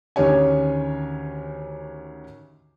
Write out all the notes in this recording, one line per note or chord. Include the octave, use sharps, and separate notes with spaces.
D2 D#3 C#4 G4 C#5 G#5